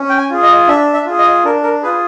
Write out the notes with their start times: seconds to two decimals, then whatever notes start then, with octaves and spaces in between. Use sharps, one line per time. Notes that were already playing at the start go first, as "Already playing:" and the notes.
Already playing: C#4
0.09 G5
0.18 G#5
0.30 F4 G#4
0.43 D#5
0.68 D4 E5
0.93 E5
1.06 F4 G#4
1.19 D#5
1.45 D4 A#4
1.63 A#4
1.82 F4 G#4 B4